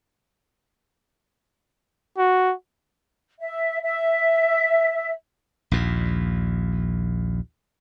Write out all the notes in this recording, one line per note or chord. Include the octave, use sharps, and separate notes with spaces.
F#4
E5
E5
A#1 D#2 A#2